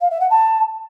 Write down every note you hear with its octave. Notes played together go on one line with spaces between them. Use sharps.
F5
E5
F#5
A5